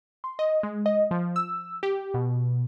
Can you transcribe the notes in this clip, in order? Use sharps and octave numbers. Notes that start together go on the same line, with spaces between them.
C6
D#5
G#3
D#5
F3
E6
G4
B2